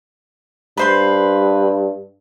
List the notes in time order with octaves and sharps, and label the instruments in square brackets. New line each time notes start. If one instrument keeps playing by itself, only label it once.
[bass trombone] G2 [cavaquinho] B4 C5 C6